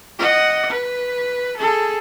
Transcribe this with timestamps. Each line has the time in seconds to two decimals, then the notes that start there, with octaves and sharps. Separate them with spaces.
0.19 D#5 F#5
0.70 B4
1.57 G#4 A4